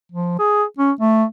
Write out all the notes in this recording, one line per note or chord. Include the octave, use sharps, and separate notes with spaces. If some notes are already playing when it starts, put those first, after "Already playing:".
F3
G#4
C#4
A3